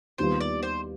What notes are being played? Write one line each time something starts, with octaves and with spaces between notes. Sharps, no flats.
D#2 D#3 G3 B3 F4 C5
D5
C5